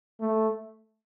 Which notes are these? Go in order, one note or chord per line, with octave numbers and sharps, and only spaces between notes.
A3